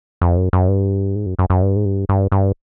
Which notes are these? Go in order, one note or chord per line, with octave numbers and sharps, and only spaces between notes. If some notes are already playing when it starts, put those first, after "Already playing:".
F2
F#2
F#2
G2
G#2
F#2
F#2
F#2
G2
G#2
G2
G2
G2